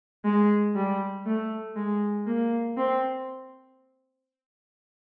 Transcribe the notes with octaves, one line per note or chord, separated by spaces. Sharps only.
G#3
G3
A3
G#3
A#3
C4